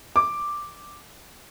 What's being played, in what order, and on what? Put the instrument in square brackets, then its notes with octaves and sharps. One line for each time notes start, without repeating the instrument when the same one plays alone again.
[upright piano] D6